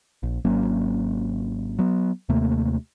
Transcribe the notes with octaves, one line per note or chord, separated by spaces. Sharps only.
A#1
G#1 F#3 A#3 C#4
F#3 B3
D#2 C3 A3 A#3